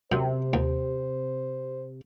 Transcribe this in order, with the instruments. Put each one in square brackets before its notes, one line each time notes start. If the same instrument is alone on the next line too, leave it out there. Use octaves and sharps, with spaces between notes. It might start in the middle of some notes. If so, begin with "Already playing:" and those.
[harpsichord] F#2 [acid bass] C3 [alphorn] C5
[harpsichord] D#2